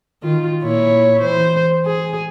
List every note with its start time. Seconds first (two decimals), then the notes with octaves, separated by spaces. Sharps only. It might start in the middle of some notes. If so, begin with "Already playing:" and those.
0.23 D#3 F4
0.62 A#2 E4 C#5
1.22 E3 C5
1.86 G#4